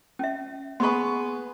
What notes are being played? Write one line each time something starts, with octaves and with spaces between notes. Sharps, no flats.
C#4 E5
B3 G#4 B4 C6 C#6